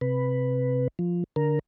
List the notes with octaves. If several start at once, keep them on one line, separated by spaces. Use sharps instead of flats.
C3 B4
F3
D3 A#4